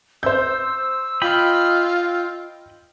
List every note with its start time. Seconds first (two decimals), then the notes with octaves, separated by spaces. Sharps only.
0.23 C5 E6 G6
1.22 F4 D#5 G5 B5